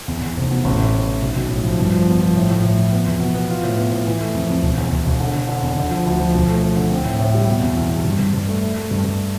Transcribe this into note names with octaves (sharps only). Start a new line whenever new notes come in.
E2
E2
F1
B2
A1
A2
A2
E3
B1
B1
A2
F3
G2
F3
B3
F3
A2
A2
A2
F3
B3
E2
B2
B3
F4
A2
B3
A2
E3
A3
F2
F2
E1
E2
E1
E1
D3
D3
D3
E2
D3
F3
D2
F3
E1
A3
A3
D3
C4
A2
A2
G3
B2
E2
E2
E2
G2
G2
G2
A3
A3
A3
G2
G2